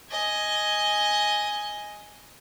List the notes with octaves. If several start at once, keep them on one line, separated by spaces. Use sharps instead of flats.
D#5 G#5